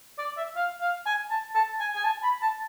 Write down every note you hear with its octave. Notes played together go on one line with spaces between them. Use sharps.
D5
E5
F5
F5
G#5
A5
A5
G#5
G#5
A5
B5
A5